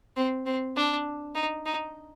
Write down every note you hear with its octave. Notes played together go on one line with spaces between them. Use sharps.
C4
C4
D4
D#4
D#4